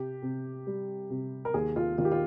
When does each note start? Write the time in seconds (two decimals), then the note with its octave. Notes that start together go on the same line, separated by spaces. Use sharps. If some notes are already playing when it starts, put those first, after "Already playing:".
Already playing: C3 G4
0.22 C3
0.67 G3
1.10 C3
1.45 A#4
1.54 D#2 G#4
1.76 F4
1.98 D#3 F4
2.05 G4
2.11 F4